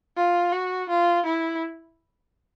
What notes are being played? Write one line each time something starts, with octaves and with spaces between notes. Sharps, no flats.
F4
F#4
F4
E4